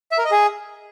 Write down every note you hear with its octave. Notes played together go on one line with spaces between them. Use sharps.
E5
A#4
D#5
G#4